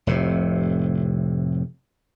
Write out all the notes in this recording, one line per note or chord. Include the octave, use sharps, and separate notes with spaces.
F1 A2 C3